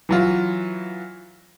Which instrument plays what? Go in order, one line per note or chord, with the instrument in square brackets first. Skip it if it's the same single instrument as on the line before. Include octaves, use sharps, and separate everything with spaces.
[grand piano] E3 F#3 F4